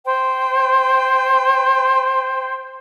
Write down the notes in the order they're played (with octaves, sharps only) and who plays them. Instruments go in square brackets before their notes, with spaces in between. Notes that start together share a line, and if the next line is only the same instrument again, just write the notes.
[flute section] C5 G5